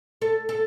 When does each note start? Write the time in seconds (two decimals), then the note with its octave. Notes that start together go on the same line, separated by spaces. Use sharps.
0.22 A4
0.49 A4